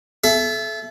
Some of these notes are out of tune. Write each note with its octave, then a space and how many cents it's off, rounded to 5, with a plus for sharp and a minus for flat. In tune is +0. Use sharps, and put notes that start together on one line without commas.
A4 -30 E5 +20